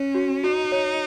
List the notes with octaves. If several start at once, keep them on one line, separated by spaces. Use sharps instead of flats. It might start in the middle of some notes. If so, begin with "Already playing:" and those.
Already playing: C#4 C#5
F#4
D#4 F#4
C#5